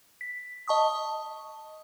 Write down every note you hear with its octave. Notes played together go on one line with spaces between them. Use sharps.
B6
D#5 A5 C#6 D#6